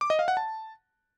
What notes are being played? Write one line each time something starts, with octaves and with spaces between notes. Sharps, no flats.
D6
D#5
F5
F#5
A5